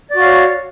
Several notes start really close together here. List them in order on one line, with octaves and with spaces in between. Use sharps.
D5 F#4 F5 C#5